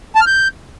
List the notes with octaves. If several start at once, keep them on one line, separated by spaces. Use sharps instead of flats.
A5
F6
G6